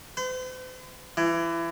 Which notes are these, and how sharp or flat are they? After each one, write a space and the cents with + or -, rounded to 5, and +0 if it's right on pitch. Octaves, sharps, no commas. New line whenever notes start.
C5 -45
E3 +25